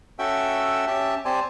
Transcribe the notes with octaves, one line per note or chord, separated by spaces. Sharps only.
C#4 F#4 A4 E5 G5 E6
C#4 G4 E5 A5
C4 G4 C5 D5 G#5 A5